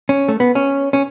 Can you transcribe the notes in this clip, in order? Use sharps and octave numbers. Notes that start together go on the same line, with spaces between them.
C#4
A3
B3
C#4
C#4